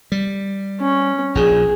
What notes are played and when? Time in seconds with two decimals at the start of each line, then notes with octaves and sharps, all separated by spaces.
0.12 G3
0.80 C#4
1.35 A#1 A#2 G#4